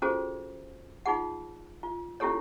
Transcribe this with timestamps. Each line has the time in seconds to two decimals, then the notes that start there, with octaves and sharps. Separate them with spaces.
0.02 C#4 F4 F#4 G#4 A4 C5
1.06 D#4 F4 G#4 F#5
1.83 F4
2.20 C#4 E4 F4 G4 A4 C#5